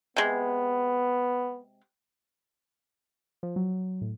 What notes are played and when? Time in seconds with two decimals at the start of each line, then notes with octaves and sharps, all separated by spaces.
0.16 C3 G#3 B3
3.43 F3
3.56 F#3
4.01 A2